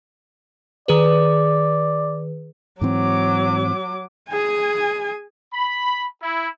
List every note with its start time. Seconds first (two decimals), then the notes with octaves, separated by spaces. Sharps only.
0.88 D#3 G#4 B4 D5
2.81 G#2 E3 F#3 C4 D6
4.30 G#4 G#5
5.54 B5
6.23 E4